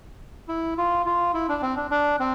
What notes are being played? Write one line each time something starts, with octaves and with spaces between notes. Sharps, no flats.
E4
F4
F4
E4
D4
C4
D4
D4
C4